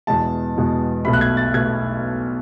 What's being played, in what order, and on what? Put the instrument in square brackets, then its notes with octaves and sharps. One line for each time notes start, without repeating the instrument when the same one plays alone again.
[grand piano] E2 B2 G#3 A5
E2 B2 G#3
B1 B2 A3 B5
F#6
G#6
A6
B2 A3 G#6